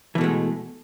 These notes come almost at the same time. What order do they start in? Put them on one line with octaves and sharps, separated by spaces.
E3 B2 A3 G#3